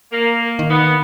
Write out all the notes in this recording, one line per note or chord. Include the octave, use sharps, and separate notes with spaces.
A#3
D#3
B3